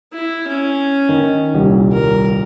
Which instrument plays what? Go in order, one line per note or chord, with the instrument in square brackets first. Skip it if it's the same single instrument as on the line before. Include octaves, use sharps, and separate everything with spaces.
[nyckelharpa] E4
C#4
[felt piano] D#3
D#1 C2
[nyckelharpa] A#4